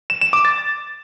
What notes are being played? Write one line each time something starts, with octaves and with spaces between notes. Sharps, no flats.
E7
E7
D6
A6